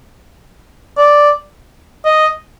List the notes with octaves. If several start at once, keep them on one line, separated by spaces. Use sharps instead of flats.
D5
D#5